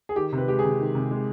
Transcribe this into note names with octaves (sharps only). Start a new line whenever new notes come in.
G#4
D#3 G4
C3 B4
G#3 G4
G#4
C3
D#3
C3
G#3